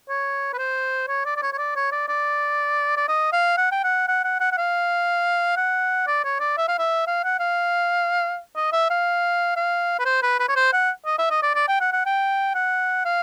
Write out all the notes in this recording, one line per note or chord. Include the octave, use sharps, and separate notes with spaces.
C#5
B4
C5
C#5
D5
D5
C#5
C#5
D5
C#5
D5
D5
D5
D#5
F5
F#5
G5
F#5
F#5
F#5
F#5
F#5
F5
F#5
D5
C#5
D5
E5
F5
E5
F5
F#5
F5
D#5
E5
F5
F5
B4
C5
B4
B4
C#5
C5
F#5
D#5
E5
D#5
D5
D5
G5
F#5
F#5
G5
F#5
F5